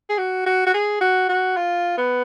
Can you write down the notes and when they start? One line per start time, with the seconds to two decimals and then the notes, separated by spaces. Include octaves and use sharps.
0.09 G#4
0.18 F#4
0.46 F#4
0.67 F#4
0.74 G#4
1.01 F#4
1.29 F#4
1.56 F4
1.98 B3